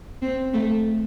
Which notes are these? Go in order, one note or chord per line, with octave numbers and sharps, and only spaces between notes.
C4
A3